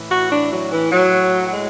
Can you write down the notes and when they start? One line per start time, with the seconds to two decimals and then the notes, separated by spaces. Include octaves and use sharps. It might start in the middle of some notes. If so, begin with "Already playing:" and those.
Already playing: A2 E3
0.10 F#4
0.30 D4
0.51 F#3
0.71 E3
0.91 F#3
1.47 F#3
1.52 G#3